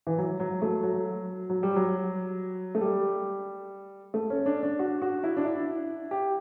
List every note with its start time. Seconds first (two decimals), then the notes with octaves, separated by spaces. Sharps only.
0.07 E3
0.18 F#3
0.40 F#3
0.62 A3
0.83 F#3
1.50 F#3
1.63 G3
1.76 F#3
2.75 A3
2.81 G3
4.14 A3
4.30 C#4
4.46 D4
4.63 D4
4.79 F#4
5.02 F#4
5.24 E4
5.37 D4
5.45 E4
6.11 G4